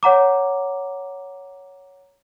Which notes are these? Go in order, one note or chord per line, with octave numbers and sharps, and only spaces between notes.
C#5 F#5 A#5 D6